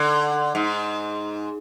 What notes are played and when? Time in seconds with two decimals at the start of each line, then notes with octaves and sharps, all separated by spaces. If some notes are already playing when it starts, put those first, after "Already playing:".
Already playing: D3
0.55 G#2